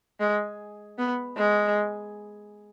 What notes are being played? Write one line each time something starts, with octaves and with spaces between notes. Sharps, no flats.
G#3
B3
G#3